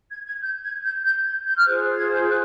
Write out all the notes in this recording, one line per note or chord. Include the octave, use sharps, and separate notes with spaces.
G#6
G#6
G6
G#6
G6
G6
G#6
G6
F6
F4 G#4 C5 F#6
G#6
G6
F#6